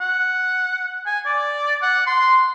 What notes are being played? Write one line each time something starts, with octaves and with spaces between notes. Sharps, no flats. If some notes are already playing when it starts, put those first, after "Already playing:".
F#5
G#5
D5
F#5
C6